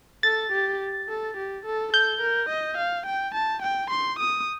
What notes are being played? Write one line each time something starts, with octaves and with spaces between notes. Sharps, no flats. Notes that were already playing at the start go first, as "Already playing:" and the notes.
A4 A6
G4
A4
G4
A4
A4 G6
A#4
D#5
F5
G5
A5
G5
C6
D#6